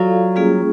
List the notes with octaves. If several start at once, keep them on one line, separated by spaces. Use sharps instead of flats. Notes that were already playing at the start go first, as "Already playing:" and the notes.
Already playing: F#3 F4 A4 D5 F5
G3 A#3 C#4 F4 G#4